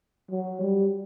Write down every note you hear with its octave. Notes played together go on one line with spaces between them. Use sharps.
F#3
G3